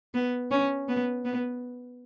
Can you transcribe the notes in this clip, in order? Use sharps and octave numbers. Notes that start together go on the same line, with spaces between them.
B3
C#4
B3
B3